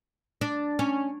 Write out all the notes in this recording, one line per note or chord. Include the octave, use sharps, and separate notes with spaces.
D4
C#4